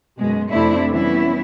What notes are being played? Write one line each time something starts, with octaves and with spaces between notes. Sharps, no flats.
F#2 B2 G#3
F2 C3 A3 C4 D4 E4
E3 G3 B3 C#4 E4